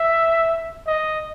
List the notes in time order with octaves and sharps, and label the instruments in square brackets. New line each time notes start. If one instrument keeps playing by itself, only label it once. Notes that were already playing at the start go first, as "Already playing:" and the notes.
Already playing: [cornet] E5
D#5